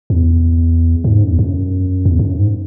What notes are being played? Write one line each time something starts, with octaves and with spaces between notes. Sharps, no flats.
E2
G#2
F#2
E2
F#2
E2
F#2
G#2